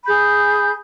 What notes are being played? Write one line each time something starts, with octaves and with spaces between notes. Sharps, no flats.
G#4 B5 G6